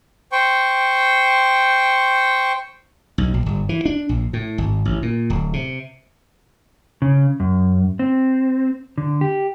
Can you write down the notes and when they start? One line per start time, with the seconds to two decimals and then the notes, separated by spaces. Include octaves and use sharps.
0.32 C5 G5 C#6
3.18 B1
3.34 A#1
3.46 G1
3.69 E3
3.85 D4
4.09 A#1
4.33 A2
4.58 G#1
4.85 A1
5.02 A#2
5.30 D1
5.53 C3
7.02 C#3
7.40 F#2
7.99 C4
8.98 D3
9.21 G4